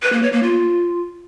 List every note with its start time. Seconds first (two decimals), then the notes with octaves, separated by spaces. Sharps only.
0.02 B4
0.12 A#3
0.23 C#5
0.33 A#3
0.43 F4